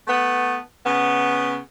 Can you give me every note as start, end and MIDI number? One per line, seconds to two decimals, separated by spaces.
0.07 0.56 57
0.07 0.56 59
0.84 1.56 49
0.84 1.56 59